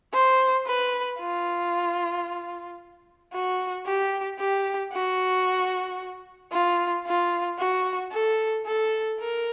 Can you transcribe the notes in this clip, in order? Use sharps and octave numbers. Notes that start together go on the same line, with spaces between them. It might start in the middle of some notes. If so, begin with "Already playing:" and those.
C5
B4
F4
F#4
G4
G4
F#4
F4
F4
F#4
A4
A4
A#4